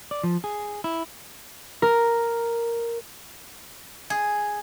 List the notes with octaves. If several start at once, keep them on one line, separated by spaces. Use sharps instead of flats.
D5
F3
G#4
E4
A#4
G#4